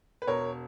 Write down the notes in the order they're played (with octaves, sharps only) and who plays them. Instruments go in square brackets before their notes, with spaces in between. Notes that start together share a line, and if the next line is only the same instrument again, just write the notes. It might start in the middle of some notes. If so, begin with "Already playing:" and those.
[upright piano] B4
E1 A#4 C#5